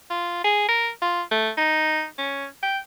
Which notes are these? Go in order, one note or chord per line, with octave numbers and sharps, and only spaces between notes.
F4
G#4
A#4
F4
A3
D#4
C#4
G5